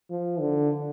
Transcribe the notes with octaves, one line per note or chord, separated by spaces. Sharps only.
F3
D3